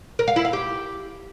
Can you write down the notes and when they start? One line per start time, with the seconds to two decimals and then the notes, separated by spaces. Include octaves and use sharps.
0.19 A#4
0.28 F5
0.36 E4
0.45 F5
0.53 G4